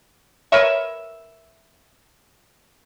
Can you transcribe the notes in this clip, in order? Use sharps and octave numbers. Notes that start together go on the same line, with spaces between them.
A#4 B4 C#5 E5